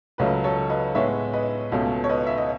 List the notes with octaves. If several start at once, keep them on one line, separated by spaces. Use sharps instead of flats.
C#2 C#3 F#3 A3 B4 D#5
A4 C#5
B4 D#5
A2 G#3 B3 C#5 E5
B4 D#5
C#2 B2 A3 C#4
C#5
B4 D#5
E5
D#5